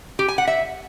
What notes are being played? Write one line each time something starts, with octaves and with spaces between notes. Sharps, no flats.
G4
G#5
F#5
E5